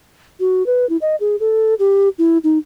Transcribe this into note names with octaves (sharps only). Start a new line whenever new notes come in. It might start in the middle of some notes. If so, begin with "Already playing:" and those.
F#4
B4
E4
D#5
G#4
A4
G4
E4
D#4